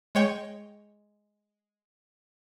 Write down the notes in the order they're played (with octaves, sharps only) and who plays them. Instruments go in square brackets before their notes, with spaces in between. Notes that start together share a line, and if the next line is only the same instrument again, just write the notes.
[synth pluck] G#3 C#5 G5